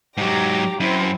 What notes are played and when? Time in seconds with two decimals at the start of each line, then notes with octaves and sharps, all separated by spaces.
0.17 G#2 F#3 G4 A#5
0.80 F#2 C4 E4